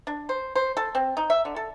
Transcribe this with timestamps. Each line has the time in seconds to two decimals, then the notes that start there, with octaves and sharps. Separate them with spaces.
0.07 D4
0.29 C5
0.56 C5
0.77 A4
0.95 C4
1.17 D#4
1.30 E5
1.45 D3
1.56 A4